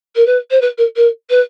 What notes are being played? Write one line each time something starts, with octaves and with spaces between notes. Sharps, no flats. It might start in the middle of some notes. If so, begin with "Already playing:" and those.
A#4
B4
C5
B4
A#4
A#4
B4